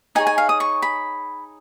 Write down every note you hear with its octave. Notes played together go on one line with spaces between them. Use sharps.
D#4 G#4 C#5 G#5
G#5
F5
D#6
C#6
B5